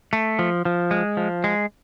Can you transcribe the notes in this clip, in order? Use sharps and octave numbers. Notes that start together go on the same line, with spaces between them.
A3
F3
F3
G#3
F3
G#3